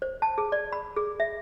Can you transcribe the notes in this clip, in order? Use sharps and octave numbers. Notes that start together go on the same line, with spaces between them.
C5
A5
G#4
D5
B5
G#4
E5